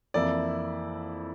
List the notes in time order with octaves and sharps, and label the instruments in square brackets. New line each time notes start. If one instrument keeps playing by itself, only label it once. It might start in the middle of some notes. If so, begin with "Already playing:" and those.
[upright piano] F2 E3 A#3 E4 [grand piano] D5